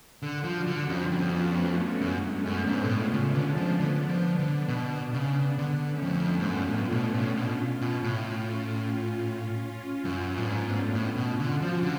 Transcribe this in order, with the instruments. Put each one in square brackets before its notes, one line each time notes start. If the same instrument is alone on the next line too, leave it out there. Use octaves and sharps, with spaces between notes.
[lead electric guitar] D3
F3
[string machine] D4 F#4
[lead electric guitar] D3
[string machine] C#4 F4
[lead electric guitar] F2
[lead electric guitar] F2 [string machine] B3 D4
[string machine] A3 C#4
[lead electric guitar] F#2 [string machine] G#3 B3
[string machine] A3 C#4
[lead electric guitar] F#2
[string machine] B3 D4
[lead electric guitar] G#2
B2
[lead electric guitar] A2 [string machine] C#4 F4
[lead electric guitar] C#3
[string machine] C#4 F4
[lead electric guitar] D3
[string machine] B3 D4
[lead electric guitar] F3
[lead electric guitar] D3 [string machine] B3 D4
[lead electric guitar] F3
D3
B2
C#3
D3
[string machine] A3 C#4
[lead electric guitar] F2
[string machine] B3 D4
[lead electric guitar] G#2
[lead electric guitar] F#2 [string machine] C#4 F4
[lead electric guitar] A2
B2
A2
B2
B2
A2
F#2
[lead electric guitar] A2 [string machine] B3 D4
[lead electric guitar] G#2
[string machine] A3 C#4
[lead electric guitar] A2
B2
[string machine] C#4 F4
[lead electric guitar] D3
[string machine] D4 F#4
[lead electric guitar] F3
D3